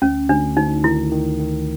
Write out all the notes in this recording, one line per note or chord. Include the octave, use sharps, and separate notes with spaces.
D2 C#4
D2 D4
D2 D#4
D#3 E4
D#3
D#3